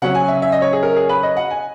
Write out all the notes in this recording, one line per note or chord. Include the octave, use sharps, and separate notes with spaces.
C#3 F#3 C#4 F#5
G#5
E5
E5
D#5
C#5
G#4
A#4
G#4
B4
D#5
F#5
G#5